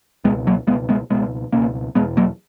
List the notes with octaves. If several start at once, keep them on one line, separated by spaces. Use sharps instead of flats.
C#2 B2 G#3 B3
F#3 A#3
C#2 B2 G#3 B3
G#3 B3
C#2 B2 G#3 B3
C#2 B2 A#3 C#4
E2 B2 G#3 B3
F#3 A#3